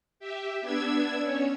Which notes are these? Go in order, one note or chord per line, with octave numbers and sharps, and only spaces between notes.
G4 E5
B3 D4 E6 G#6
C#4 C#5